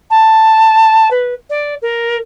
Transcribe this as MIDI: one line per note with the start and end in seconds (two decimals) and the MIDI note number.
0.10 1.08 81
1.11 1.34 71
1.50 1.74 74
1.82 2.17 70